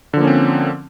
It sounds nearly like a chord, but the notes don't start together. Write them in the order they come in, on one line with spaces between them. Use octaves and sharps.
D3 F3 A#3 C#4 C4